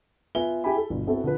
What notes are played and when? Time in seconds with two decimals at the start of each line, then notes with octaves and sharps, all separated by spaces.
0.35 B3 F4 B4 E5 G#5 G7
0.64 E4 G4 G#4 G5 G#5 B5
0.77 A4
0.90 G1 B2
1.07 B3 C4 E4 F#4 A4
1.24 D3 F3 B4